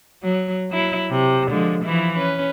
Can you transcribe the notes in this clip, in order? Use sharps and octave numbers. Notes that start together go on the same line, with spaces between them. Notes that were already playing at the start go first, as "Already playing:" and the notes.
F#3
F#3 E4
C3
D3 F3 G#3
E3 F3 E4
C#4 B4